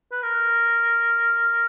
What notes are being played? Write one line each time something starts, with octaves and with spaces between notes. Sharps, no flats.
B4
A#4